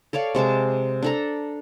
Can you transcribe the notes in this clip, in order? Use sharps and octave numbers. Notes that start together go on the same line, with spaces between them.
A4 C#5 D5 F5
C3 G#3 A5 D6
D4 A4 A#5